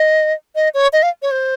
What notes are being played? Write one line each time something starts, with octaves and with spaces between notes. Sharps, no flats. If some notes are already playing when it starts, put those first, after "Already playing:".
Already playing: D#5
D#5
C#5
D#5
F5
C#5
C5